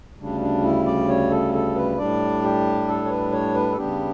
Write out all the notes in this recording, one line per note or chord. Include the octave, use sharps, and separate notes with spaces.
D2 C#3 G3 D4
D4
E4
D5
C#5
A4
A4
B4
A2 G3 D4 D5
G4
A4
C#5
B4
C#5
B4
A4
C#3 G3 B3 D4 G4